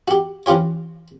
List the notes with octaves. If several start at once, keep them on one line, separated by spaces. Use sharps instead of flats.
F#4 G4
E2 C#4 F4 G4 C#5